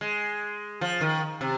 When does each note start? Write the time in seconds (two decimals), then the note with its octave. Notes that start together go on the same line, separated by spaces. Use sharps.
0.01 G#3
0.81 F3
1.01 D#3
1.41 C3